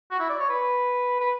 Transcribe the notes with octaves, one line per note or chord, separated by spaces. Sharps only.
F#4
E4
D5
C#5
B4
B4